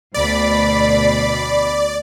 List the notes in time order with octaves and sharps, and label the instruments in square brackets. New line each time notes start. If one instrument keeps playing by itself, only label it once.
[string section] D2 B2 B5 [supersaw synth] D5